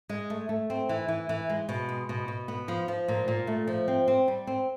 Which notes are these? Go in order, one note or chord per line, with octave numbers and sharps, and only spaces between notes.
G#3
A3
A3
C4
E3
E3
E3
G#3
B2
G#3
B2
B2
B3
F3
F3
A#2
A#2
A3
F3
C4
C4
G3
C4